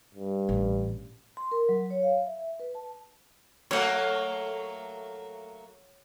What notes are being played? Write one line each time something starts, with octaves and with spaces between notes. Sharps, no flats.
G2
A1
C6
A#4
F#3
C#5
F5
E5
B4
A5
F#3 A3 A#3 C#5 F#5